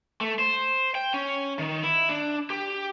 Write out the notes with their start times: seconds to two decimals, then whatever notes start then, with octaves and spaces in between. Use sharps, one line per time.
0.21 A3
0.39 C5
0.95 G5
1.14 C#4
1.59 D#3
1.83 E4
2.09 D4
2.50 G4